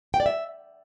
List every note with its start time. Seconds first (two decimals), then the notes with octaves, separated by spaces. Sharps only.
0.14 G5
0.20 D5
0.26 E5